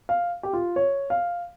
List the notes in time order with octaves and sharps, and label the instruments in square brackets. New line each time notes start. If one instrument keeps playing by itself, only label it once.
[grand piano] F5
G4
F4
C#5
F5